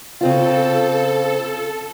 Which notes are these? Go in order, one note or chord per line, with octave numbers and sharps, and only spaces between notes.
C#3 C4 F4 A4